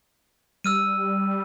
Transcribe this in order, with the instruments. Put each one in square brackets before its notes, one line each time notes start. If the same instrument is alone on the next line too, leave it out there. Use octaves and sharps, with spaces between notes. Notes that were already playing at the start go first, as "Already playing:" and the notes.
[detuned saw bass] G3 [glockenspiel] E6 F6 D#7